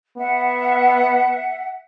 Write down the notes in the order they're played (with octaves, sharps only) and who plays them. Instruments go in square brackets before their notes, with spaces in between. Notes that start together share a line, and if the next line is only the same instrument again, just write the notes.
[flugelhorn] B3 [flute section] E5 F#5